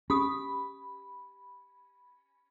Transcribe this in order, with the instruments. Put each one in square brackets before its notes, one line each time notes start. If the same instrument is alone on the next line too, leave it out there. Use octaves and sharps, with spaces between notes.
[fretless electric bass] C#4 [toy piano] G4 D#6 [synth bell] B5